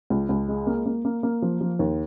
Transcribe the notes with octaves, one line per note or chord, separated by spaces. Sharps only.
C#2
C#2
G#3
A#3
A#3
A#3
A#3
F3
F3
D#2